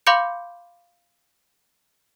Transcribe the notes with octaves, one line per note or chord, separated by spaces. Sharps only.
F5 B5 C6 D6 G6 C#7